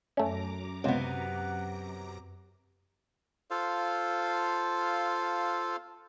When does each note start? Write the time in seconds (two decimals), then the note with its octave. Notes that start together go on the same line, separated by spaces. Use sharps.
0.17 F#2 A3 C#4 A#5 D6
0.84 C#2 C3 B3 F#5
3.51 F4 A4 C5 F5